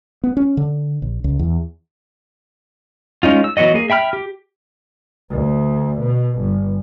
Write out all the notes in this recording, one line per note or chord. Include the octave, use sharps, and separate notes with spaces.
B3
C#4
D3
A#1
C#2
E2
G#3 C#4 D#4 F4
E6
E3 F#3 B3 F#4 D#5
A#3 G#4
E5 G5 B5 F6
G4
D2
B2
G1